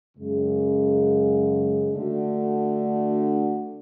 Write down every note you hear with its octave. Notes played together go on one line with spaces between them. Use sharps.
F#2 C#3 G#3
D3 A3 D4 F#4